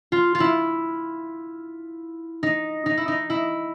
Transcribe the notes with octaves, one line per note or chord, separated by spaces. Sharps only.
F4
F4
E4
D#4
D#4
E4
D#4
E4